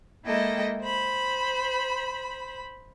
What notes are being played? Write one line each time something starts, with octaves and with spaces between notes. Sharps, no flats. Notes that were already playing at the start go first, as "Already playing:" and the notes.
G#3 A#3 E4 A4 D#5 G5
C5 B5